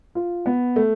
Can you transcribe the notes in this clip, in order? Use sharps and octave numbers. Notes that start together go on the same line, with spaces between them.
F4
B3
A3